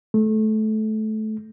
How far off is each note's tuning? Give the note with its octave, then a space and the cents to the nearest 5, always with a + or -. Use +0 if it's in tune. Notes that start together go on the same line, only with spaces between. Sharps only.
A3 -20